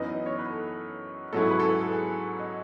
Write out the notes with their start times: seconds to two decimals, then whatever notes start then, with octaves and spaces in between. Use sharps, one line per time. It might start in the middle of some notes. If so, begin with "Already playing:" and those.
Already playing: F#2 E3 B3 D#4 D#5
0.26 C#5
0.39 B4
0.50 A4
1.33 G#2 F#3 C#4 E4 A4
1.43 G#4
1.51 B4
1.60 A4
1.69 B4
1.81 A4
1.92 G#4
2.39 D#5